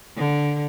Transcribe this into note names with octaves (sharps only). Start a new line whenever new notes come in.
D3